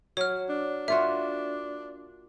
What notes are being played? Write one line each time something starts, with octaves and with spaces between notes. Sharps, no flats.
F#3 C#5 F6
D4
A#3 F4 F#4 E5